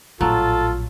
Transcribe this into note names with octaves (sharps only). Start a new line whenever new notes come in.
A#1 A2 F#3 F4 A4